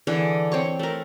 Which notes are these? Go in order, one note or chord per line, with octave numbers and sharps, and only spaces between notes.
D3 E3 G#4
C4 C#5 C#6
A3 A#4